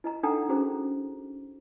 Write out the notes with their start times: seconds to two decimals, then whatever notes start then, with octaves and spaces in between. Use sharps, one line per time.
0.04 E4 D#5 A#5
0.23 D4 D#4 A4 F#5 G5 A#5
0.49 C#4 F#4 G#4 C5 A#5